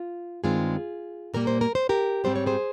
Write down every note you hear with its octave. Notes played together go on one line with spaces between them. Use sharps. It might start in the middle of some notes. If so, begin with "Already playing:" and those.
Already playing: F4
G2 D#3 G#3 C4 F4 G#4
A#2 G3 A#3 A#4
C5
A#4
C5
G4 A#4
G#2 G3 C4 C5
C#5
G#4 C5